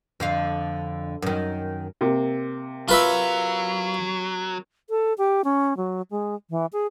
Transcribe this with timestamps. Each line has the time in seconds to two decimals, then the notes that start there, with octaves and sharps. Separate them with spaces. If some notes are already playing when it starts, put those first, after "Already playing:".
0.20 F2 D3 F5
1.22 F#2 D#3
2.01 C3 A#3
2.88 F#3 F4 B4 E5
4.90 A4
5.18 G4
5.44 C#4
5.77 F#3
6.11 G#3
6.50 E3
6.73 G#4